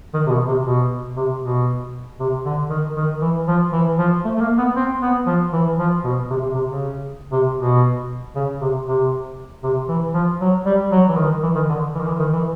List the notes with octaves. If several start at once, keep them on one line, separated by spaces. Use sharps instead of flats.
D#3
C3
B2
C3
B2
C3
B2
C3
D3
D#3
D#3
E3
F3
E3
F3
A3
A3
A#3
B3
C4
B3
F3
E3
F3
B2
C3
C3
C3
C#3
C3
B2
C#3
C3
C3
C3
E3
F3
F#3
G3
F#3
E3
D#3
E3
D#3
D3
E3
D#3
E3
D#3
E3